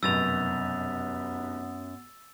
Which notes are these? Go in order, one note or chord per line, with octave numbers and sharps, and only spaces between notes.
F1 B1 F#2 B3 E6 A6 F7